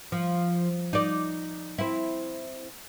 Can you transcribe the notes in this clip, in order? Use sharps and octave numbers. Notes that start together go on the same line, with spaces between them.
F3
D#4 D5
C4 E4